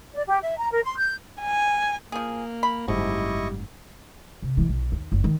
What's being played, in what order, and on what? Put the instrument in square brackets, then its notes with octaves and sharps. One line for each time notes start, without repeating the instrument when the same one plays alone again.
[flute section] D5
G4
E5
A#5
A#4
C6
G6
[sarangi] G#5
[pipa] F3 G#4 [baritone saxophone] A#3
[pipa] B5
[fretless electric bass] F#1 G#2 [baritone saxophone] G3 [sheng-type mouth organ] E4 D#5 C#6
[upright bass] C3
D3 E3
B1
D#2
F#1
D#3 G#3